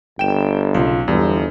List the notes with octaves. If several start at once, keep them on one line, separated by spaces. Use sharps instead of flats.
G1 G5 E7
B1 C#3 F4
G1 E2 G3